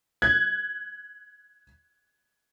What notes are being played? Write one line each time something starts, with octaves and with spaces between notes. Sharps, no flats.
F#6 G#6